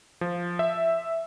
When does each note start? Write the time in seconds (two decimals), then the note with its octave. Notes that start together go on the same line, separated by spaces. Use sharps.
0.21 F3
0.59 E5